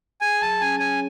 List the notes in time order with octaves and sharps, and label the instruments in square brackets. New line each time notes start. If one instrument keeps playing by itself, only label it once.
[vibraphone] G#4 [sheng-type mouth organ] G#5
[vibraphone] F#3 [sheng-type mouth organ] A5
[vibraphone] C#4 [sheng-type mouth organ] G#5
[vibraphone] C#5 [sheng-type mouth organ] G#5